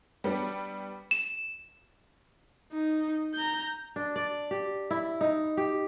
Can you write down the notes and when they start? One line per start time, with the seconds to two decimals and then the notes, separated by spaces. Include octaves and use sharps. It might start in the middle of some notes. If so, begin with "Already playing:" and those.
0.24 G3 B3 D4
1.11 E7
2.73 D#4
3.34 A#5 G6
3.96 D4
4.16 D5
4.51 G4
4.91 E4
5.21 D#4
5.57 G4